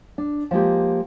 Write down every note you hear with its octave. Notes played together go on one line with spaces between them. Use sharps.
D4
F3 G#3 A#3 G4